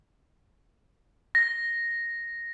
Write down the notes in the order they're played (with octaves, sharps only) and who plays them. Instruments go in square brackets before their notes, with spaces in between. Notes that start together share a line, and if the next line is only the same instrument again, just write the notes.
[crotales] A#6